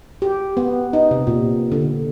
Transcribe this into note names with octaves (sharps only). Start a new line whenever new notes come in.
G4
B3
D#4
C3
A#2
D3